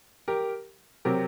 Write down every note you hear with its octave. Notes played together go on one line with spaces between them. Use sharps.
G4 A#4
C3 F#3 C4 G4 A#4